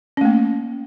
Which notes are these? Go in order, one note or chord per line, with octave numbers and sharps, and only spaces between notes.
A3 A#3 C#4